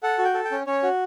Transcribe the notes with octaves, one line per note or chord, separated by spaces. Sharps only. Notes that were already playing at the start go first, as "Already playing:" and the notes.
A4 F#5
F#4
G5
A4
G5
C#4
C#4 C#5
F#4